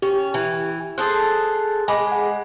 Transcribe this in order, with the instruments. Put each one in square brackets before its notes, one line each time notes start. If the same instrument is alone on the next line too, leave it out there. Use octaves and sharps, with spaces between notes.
[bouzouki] C#4 [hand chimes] G4
[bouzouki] E3
[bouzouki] G#4 A4 C5 [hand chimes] F#6
[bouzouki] G#3 [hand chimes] G#5 B5 D6
[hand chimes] F#5